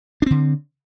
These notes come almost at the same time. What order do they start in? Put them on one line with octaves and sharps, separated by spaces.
D4 C4 D3